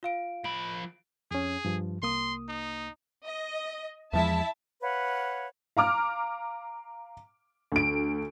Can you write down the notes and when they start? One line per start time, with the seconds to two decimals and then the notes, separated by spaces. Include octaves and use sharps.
0.03 F4 F5 D7
0.44 F3 B5 D7
1.31 F2 C#4 G#4
1.65 G2 F3
2.02 C2 A#3 C6 D#6
2.48 D#4
3.25 D#5
4.13 E2 F3 G#3 E4 E5 A5
4.82 B4 C#5 F5 F#5
5.77 F5 A#5 D6 F6
7.72 D2 D7